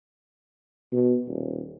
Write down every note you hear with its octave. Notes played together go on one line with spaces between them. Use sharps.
B2
D#1